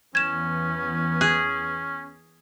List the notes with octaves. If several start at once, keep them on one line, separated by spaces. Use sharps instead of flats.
E2 B3 C#4 G#6 E7
G#4 F#6